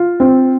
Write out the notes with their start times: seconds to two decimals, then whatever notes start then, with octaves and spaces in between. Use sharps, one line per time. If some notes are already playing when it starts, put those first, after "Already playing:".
Already playing: F4
0.20 C4